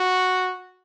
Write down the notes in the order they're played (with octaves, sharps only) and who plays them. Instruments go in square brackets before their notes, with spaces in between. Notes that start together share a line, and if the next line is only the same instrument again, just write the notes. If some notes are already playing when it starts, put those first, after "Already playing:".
Already playing: [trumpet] F#4